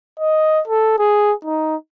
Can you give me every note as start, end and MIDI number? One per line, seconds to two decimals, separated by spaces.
0.19 0.61 75
0.67 0.97 69
0.98 1.33 68
1.45 1.75 63